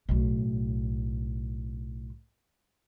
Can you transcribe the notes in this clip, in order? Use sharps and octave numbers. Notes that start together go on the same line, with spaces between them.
B1 A2